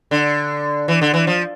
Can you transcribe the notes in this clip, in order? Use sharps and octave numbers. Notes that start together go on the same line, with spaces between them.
D3
E3
D3
E3
F3